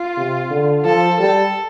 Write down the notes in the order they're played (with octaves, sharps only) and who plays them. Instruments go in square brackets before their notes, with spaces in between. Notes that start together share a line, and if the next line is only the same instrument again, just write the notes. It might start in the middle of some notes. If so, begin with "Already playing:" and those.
Already playing: [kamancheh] F4
[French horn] C3
D3
[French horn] F3 [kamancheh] A4
[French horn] G3 [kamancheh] A4